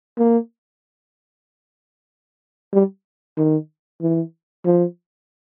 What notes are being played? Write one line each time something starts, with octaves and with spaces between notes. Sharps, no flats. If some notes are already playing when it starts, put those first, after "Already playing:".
A#3
G3
D#3
E3
F3